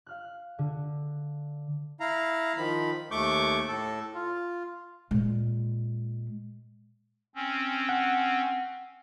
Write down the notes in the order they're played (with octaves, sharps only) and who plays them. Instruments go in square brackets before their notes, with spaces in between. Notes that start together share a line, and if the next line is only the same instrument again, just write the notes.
[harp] F5 F6 F#6
D3
[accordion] E4 F5 A#5
D#3 F3 B5
D#2 A3 C#6 D6 G6
A2 A4
F4
[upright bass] A#2 G#3
[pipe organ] C4 C#4
[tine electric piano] F#5